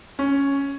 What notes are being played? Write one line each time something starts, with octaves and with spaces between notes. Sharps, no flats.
C#4